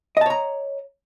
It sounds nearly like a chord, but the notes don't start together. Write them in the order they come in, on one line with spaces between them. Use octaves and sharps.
D#5 A5 C#5 A#5